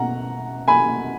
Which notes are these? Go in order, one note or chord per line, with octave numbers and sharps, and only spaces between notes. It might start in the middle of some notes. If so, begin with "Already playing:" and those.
Already playing: B2 F#5 A#5
G#5 B5